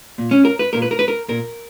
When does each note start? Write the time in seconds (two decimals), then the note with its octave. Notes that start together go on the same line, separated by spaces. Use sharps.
0.18 A#2
0.31 C#4
0.45 A#4
0.59 B4
0.73 A#2 A#4
0.82 B4
0.91 A#4
0.99 B4
1.08 A#4
1.28 A#2 A#4